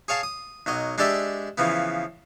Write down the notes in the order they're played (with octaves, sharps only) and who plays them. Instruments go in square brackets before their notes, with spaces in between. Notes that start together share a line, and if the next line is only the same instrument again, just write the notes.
[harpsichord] G#4 C#5 F5 A5
D#6
B1 F#3 D#5
G#3 D4 G4 A4 D5 E5
C#3 E3 F3 B3